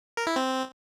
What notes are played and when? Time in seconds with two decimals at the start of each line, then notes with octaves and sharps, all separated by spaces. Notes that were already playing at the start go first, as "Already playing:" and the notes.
0.17 A#4
0.27 E4
0.36 C4